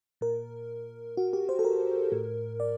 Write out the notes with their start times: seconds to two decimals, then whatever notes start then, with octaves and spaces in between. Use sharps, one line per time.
0.21 A#2 A#4
1.17 F#4
1.33 G4
1.49 C5
1.59 A4
1.65 A#4
2.12 A2
2.60 D5